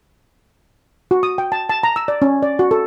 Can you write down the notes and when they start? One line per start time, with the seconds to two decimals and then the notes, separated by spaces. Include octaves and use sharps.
1.11 F#4
1.23 D#6
1.38 G5
1.52 A5
1.69 A5
1.83 A#5
1.96 E6
2.08 D5
2.22 C#4
2.43 D5
2.59 F#4
2.71 A4